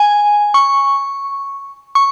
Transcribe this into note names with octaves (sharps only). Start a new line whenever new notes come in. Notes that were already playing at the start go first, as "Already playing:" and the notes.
Already playing: G#5
C#6
C#6